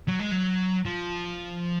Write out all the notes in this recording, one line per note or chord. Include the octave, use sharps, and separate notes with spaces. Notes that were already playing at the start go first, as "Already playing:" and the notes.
F#3
G#3
F#3
F3